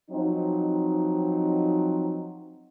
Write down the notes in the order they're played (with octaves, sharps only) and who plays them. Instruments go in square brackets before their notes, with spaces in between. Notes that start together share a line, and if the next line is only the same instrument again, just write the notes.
[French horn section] F3 F#3 C4 D#4